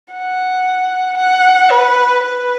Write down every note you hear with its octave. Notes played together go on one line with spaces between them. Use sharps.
F#5
F#5
B4
B4